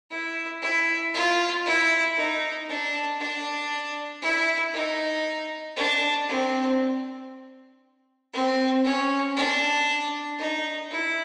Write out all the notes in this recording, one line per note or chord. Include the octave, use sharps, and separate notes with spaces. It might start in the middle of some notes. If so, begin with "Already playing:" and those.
E4
E4
F4
E4
D#4
D4
D4
E4
D#4
D4
C4
C4
C#4
D4
D#4
E4